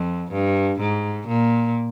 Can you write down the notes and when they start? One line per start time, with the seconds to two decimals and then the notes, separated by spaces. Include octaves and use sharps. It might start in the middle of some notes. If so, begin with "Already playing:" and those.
Already playing: F2
0.31 G2
0.79 G#2
1.27 A#2